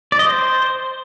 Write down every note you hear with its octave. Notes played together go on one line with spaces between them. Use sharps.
D5
D#5
C5